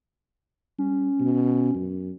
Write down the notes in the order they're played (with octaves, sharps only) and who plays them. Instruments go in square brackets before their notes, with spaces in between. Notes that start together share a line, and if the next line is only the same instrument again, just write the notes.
[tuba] G3 [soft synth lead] C#4
[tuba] B2
F#2